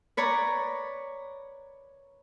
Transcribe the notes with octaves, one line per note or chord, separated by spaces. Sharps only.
B4 C#5 D5 A#5